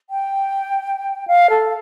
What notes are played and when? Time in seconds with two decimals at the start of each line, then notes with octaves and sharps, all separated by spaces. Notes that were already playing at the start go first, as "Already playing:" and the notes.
0.10 G5
1.28 F5
1.50 A4